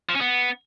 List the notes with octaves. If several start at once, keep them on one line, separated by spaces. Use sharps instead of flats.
F3
C#4
B3